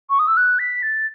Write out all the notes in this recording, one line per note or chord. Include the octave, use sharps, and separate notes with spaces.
C#6
D#6
E6
F#6
B6
A6